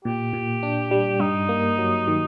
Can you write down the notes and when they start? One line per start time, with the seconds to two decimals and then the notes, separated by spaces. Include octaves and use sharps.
0.05 A#2 G4
0.33 A#2
0.63 D4
0.91 G3
1.20 G2 D#4
1.49 A#3
1.78 F#3
2.08 D#3